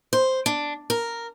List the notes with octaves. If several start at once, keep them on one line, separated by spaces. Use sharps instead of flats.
C5
D4
A#4